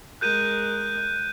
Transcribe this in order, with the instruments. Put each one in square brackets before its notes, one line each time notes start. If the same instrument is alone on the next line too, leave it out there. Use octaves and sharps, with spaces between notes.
[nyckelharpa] G#3 A#4 [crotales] F#6 G6 D#7